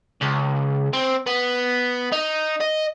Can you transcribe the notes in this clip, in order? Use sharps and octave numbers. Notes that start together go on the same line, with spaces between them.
C#2
C4
B3
D#4
D#5